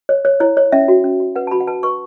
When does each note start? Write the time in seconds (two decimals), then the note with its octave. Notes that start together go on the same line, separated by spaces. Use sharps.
0.09 C#5
0.25 C#5
0.40 E4 C#5
0.57 C#5
0.72 C#4 E5
0.88 F#4
1.04 C#4
1.20 F#4
1.36 B4 F#5
1.47 A5
1.51 F#4 B5
1.60 F#5
1.67 B4 A5
1.83 B4 C#6